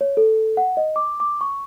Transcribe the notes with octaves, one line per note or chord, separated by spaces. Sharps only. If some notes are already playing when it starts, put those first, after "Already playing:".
C#5
A4
F#5
D#5
D6
D6
C#6